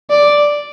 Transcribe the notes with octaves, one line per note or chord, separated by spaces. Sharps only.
D5